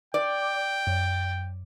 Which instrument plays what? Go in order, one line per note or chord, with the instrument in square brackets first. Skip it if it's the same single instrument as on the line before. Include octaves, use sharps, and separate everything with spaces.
[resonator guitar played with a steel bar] D5 [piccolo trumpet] G5
[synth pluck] F#2